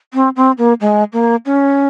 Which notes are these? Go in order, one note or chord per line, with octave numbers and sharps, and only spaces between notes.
C4
C4
A#3
G#3
A#3
C#4